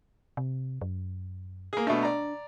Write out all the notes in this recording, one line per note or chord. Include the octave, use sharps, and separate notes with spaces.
C3
F#2
A#3 G#4
B2 A3 D4
D5 A#5